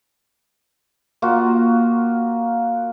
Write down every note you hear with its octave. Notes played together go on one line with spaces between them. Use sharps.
A#3 F4 F#4